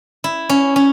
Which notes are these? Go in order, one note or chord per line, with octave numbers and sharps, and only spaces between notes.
E4
C#4
C#4